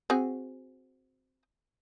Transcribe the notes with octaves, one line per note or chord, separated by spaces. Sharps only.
C4 F#4 G#4